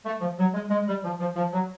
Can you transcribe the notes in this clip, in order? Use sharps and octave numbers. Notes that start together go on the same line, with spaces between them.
A3
F3
F#3
G#3
G#3
G3
F3
F3
F3
F#3